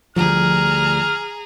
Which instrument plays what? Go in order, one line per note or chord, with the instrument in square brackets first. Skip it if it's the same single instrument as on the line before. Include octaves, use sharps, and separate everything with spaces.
[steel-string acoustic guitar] D2 G3 [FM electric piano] F3 [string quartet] G#4 A#5 [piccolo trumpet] F6